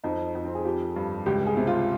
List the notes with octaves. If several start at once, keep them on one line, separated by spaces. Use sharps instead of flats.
F2 D#4
F2
C4
G#4
F3 G4
G2
C#2 G4
G#4
C3
F4